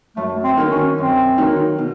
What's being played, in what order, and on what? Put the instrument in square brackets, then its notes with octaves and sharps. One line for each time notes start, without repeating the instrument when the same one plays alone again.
[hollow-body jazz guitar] F#2 [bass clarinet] A3
[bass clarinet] C4
[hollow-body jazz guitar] D#3 F#3 A#3 D#4
[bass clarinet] C#4
[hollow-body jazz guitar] F#2 [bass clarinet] C4
[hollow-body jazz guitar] D#3 F#3 A#3 D#4
B2